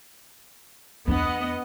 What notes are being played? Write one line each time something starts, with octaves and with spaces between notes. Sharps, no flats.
E2 B3 D4 D#5 F#5